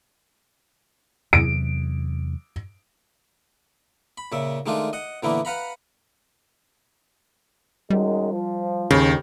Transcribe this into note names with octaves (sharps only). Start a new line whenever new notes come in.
E2 C3 F#3 D7
B5
A#2 C#3 E5
D#3 G#3 A3 D4 F4
D#5 F#5
A#2 D3 E3 A#3 B3 E4
B4 F5 F#5 A#5 B5
F#2 D#3 G3 G#3
F3
D#2 C#3